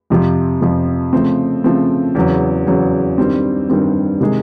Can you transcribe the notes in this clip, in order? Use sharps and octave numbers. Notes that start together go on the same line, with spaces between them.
F2 C3 F3
F2 C3 F3
C#3 F3 A3 C4
C#3 F3 A3 C4
E2 C#3 F#3
E2 C#3 F#3
G2 D#3 G3 C4
G2 D#3 G3 C4
C3 D#3 G#3